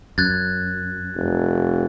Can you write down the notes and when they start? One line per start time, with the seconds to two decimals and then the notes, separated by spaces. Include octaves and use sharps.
0.18 F#2 F#6 G#6 A6
1.15 F1